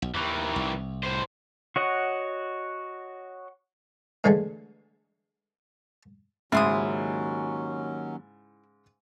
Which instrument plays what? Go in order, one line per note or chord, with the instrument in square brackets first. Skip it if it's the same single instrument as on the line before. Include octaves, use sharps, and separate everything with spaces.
[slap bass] B1
[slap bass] D#2 [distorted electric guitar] D#3 E3
[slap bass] C2
[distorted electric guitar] A2 C5
[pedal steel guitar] F#4 C#5 D#5 F#5
[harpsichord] A2 D3 E3 G#3 A3
[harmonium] D#2 F#3 C#4 [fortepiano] G#2 C#3 [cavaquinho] E4 C6 D#6